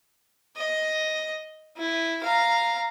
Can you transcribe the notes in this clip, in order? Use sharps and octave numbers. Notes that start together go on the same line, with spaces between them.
D#5
E4
F5 A#5